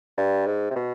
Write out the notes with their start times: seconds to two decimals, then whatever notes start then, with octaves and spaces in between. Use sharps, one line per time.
0.17 G2
0.46 G#2
0.70 C3
0.75 B2